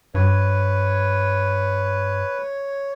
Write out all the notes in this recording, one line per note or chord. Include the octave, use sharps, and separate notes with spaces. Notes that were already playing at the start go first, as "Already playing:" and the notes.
G2 B4 C#5